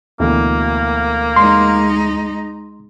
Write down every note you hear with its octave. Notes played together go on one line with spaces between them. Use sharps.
D2 B2 E3 A#3
G#3 D#4 C6